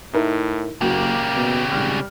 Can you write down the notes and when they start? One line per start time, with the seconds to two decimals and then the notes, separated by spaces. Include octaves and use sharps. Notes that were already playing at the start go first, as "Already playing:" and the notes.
0.13 A2 D#4 E4 A#4
0.81 F#1 C#3 A#3 F#4 G4
1.36 B2
1.72 G#1 G3 F6